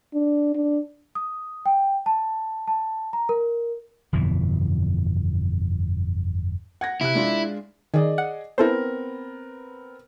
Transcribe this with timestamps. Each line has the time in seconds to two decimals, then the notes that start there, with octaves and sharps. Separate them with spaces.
0.14 D4
0.55 D4
1.15 D#6
1.66 G5
2.06 A5
2.68 A5
3.13 A#5
3.29 A#4
4.13 G1 F2 B2 E3
6.81 F#5 G#6 A#6
7.01 C3 E4 F#6
7.15 G#3 D4 F4
7.94 D#3 G#4 D5 D#5
8.18 F#5
8.58 B3 C4 E4 A4 A#4 C5